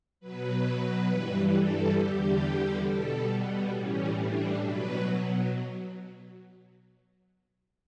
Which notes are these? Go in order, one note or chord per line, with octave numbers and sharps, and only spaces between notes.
B2 F#3 B4
G2 E3 G3
A4
E2 D3 G3 G4
B2 G3 A4
B3
A2 E3 G3 C#4
D4
B2 F#3 B4